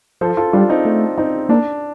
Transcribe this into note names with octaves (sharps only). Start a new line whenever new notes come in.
F3 A4 C5
F4 A4
G3 D4 F4
C4 D#4
A3
C4 D#4
A#3 D4